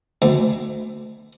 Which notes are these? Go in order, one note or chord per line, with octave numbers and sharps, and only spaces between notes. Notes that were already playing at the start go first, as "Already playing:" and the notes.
D2